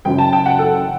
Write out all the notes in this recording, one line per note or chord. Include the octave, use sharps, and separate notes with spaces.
F#1 F#2 F#3 G5
A5
G5
F#5
A4